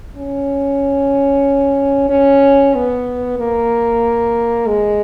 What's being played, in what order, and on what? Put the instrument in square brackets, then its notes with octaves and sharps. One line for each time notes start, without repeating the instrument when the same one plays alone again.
[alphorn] C#4
C#4
B3
A#3
G#3